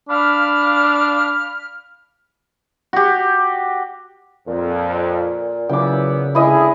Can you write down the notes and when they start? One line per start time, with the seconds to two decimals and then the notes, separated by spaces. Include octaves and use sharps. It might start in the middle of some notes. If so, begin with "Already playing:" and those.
0.09 D4 F5 B5 F6
2.93 F#4 G4
4.47 F2 A#2
5.69 C#3 F#3 B3 E4 G5 D6
6.35 C#2 D3 E4 G#4 D#5